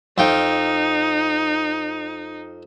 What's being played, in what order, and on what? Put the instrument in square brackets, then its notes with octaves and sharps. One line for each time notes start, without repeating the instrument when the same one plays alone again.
[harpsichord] F2 F4 G5 [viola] D#4